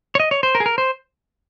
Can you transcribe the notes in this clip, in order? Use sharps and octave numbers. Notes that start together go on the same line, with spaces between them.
C#5
D#5
C#5
C5
A#4
G#4
A#4
C5